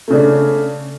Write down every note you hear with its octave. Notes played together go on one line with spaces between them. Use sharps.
C#3 A3 C#4 D4